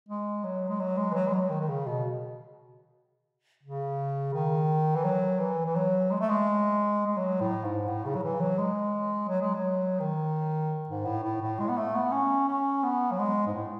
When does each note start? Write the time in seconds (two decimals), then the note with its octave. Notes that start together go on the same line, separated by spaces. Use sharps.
0.08 G#3
0.44 F#3
0.69 G#3
0.80 F#3
0.97 G#3
1.11 E3
1.14 F#3
1.28 G#3
1.33 F#3
1.50 D#3
1.60 D#3
1.68 C#3
1.86 B2
3.63 C#3
4.34 D#3
4.95 E3
5.04 F#3
5.40 E3
5.65 E3
5.76 F#3
6.11 G#3
6.20 A3
6.30 G#3
7.06 G#3
7.17 F#3
7.41 A2
7.64 G#2
7.88 A2
8.05 C#3
8.15 F#3
8.23 E3
8.40 F#3
8.58 G#3
9.29 F#3
9.41 G#3
9.54 F#3
10.00 D#3
10.89 G#2
11.05 A2
11.23 A2
11.42 A2
11.60 G#3
11.69 B3
11.77 A3
11.95 B3
12.12 C#4
12.48 C#4
12.83 B3
13.11 F#3
13.19 G#3
13.47 G#2
13.54 A2